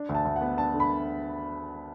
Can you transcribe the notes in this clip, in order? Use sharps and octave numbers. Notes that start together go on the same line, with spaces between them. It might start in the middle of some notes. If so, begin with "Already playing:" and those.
Already playing: D4
D2
A5
D2
F#5
B3
D4 A5
D3
B5